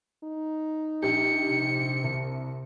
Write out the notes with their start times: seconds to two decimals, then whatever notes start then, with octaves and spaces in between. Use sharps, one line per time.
0.24 D#4
1.03 A#1 G4 C#7
1.49 C3
2.04 C2